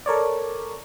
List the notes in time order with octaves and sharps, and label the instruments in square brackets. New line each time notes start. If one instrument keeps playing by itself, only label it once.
[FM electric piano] A4 A#4 C#5 D5